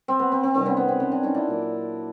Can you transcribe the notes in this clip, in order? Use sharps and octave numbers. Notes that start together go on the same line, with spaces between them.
C4
B3
C4
C4
C3 D#3 G3 B3 C4
B3 C#4
B3
C4
B3 C#4
C4 D4
C#4 D#4
D4 E4
A#2 F#3 A#3